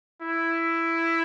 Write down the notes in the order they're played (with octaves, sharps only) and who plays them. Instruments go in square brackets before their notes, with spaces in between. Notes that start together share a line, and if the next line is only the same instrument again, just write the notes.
[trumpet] E4